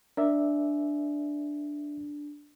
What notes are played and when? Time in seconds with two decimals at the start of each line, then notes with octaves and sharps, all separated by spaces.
0.17 D4 A#4 D5 E5